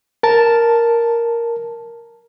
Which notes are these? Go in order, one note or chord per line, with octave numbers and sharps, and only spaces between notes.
A#4 A5